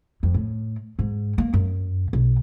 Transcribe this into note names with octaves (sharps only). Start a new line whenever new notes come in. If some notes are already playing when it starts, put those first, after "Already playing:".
F2
A2
G#2
A#3
F#2
B1